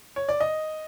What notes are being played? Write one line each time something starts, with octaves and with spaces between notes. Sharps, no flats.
C#5
D5
D#5